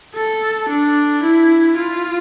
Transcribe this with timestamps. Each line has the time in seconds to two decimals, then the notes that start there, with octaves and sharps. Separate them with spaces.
0.15 A4
0.69 D4
1.23 E4
1.77 F4